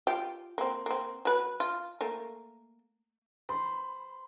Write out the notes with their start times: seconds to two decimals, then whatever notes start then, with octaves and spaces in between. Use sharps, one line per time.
0.07 F4 G4
0.58 A#3 C4
0.86 A#3 C4
1.25 F#3 B4
1.60 F4
2.01 A3 A#3
3.49 C5 B5